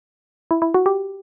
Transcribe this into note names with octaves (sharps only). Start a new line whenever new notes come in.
E4
E4
F#4
G4